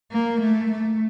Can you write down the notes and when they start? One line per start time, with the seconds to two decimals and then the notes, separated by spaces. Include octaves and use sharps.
0.12 A#3
0.41 A3
0.72 A3